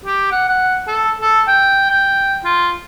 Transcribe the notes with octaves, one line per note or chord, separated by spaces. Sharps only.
G4
F#5
F#5
A4
A4
G5
G5
F4